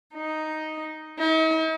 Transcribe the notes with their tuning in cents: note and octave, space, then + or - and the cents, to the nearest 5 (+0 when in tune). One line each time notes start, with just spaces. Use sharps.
D#4 +0
D#4 +45